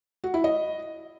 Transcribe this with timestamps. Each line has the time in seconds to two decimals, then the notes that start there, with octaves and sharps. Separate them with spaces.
0.24 F#4
0.34 E4
0.44 D#5